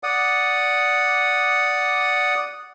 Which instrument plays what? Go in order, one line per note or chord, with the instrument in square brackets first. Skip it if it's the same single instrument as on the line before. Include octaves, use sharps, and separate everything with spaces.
[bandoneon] D5 F#5 D#6